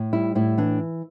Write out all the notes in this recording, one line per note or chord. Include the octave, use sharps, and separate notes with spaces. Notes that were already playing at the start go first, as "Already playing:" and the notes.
Already playing: A2
G3 E4
A2 E4
E3 D4